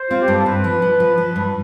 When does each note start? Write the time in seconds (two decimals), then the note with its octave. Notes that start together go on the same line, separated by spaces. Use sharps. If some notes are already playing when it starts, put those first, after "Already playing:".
Already playing: C5
0.10 C4 F4
0.22 G4
0.28 G2
0.34 A4
0.46 C4 B4
0.64 F3
0.82 F3
1.00 F3
1.18 F3
1.36 G2